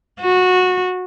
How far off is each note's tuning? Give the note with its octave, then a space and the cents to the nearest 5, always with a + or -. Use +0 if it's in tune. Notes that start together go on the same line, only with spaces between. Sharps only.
F#4 -15